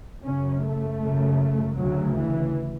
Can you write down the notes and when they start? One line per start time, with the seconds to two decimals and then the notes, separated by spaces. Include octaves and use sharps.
0.23 F#2 C#3 C#4
0.61 A3
1.00 F#2 C#3
1.76 D2 C#3 F#3
2.15 E3